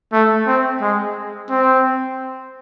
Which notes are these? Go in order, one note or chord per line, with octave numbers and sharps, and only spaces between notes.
A3
C4
G#3
C4